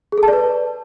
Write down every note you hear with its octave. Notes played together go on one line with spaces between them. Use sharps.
G#4
A4
A5
D5
B4